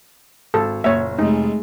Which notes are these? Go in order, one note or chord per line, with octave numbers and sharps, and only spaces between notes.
G#1 A4
F#1 A#2 C#5 E5
F1 G#3 A3 D#4